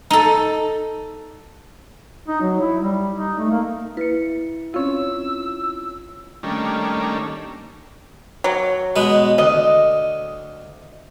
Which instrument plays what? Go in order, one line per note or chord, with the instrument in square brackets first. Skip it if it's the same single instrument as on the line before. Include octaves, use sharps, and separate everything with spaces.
[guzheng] D#4 A4
[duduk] D#4
F#3
E4
G3
D#4
A3
A#3
[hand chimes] E4 C#7 [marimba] B4
[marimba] C4 C#4 [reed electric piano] F4 C#5 [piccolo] E6
[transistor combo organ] D#3 G3 A3 A#3 C#4 D4
[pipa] F#3
[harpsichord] B2 G#3 B4
[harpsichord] D2 [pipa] D#5